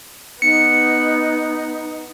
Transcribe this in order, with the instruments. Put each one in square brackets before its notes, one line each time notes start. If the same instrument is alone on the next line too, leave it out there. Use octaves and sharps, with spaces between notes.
[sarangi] B3 [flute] D#4 [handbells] C#7